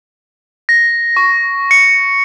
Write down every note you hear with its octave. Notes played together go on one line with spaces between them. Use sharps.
A#6
C#6
C#7